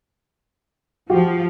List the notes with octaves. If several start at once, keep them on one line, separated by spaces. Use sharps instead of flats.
F3 F#4 G4